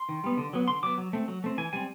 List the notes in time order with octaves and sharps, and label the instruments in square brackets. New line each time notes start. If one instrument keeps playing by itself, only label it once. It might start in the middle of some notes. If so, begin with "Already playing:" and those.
Already playing: [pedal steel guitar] C6
D#3
G3 B3
D3
F#3 B3
D3 C6
F#3 B3 D6
F#3
A3 C4
F#3
A3 C4
E3 G#5
G3 C4 G#5